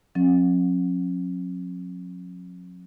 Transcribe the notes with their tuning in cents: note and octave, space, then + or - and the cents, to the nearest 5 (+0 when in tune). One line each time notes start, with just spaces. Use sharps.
F#3 -45 C#4 -45